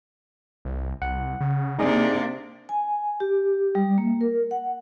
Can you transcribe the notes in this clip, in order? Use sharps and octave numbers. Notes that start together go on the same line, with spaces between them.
C2
C2 F#5
C#3
C3 A#3 D4 D#4 G#4 D5
G#5
G4
G3
A#3
A#4
F#5